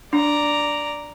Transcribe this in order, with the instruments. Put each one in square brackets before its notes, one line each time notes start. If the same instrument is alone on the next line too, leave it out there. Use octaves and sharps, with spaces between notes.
[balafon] D4 [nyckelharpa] D5 A#5